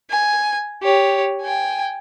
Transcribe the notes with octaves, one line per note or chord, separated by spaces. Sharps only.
G#5
G4 C#5
G5 G#5